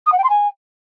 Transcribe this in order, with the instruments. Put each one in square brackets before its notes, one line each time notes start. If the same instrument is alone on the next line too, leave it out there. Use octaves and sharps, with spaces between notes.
[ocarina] D#6
F#5
G5
C6
G#5